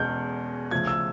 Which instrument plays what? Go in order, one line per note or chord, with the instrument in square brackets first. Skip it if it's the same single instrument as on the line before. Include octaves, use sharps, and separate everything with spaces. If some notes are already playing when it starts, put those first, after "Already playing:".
Already playing: [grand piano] E2 B2 G#3 C#4 G6
C#3 F3 A3 G#6
E6